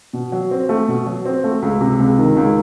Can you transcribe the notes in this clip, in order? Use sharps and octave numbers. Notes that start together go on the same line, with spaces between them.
B2
F#3
C4
A3
B2
F#3
C4
A3
C#2
C3
C#2
D#3
C#2